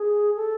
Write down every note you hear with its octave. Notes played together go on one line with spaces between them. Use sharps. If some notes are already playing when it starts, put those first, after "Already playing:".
Already playing: G#4
A4